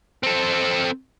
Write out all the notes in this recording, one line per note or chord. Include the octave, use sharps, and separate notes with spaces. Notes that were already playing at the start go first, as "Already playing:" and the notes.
C4 A4